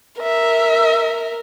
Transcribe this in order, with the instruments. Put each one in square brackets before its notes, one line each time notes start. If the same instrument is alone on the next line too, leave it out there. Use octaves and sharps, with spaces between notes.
[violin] A#4 [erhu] E5